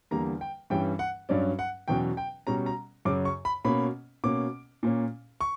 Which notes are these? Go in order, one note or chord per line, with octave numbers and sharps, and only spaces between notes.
E2 D3 G3 A#3 A#5
G5
G2 E3 G3 C#4 G5
F#5
G2 F#3 C#4 D5
F#5
E2 B2 F#3 C#4 G5
G5
B2 G3 C#4 A#5
A#5
F#2 C#3 F#3 D6
C#6
B5
B2 A#3 C#4 B5
B2 A#3 C#4 D6
A#2 A#3 C#4
C#6